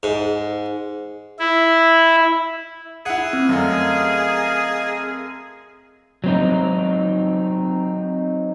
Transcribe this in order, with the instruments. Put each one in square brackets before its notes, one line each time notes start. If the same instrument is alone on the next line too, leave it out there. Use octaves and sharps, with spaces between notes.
[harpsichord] G#2
[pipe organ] E4
[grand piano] E4 F#5 [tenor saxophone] G#4
[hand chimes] C4
[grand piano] F#2 A3 [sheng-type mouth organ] A#4 D#5 F5
[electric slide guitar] F#3 C4 D#4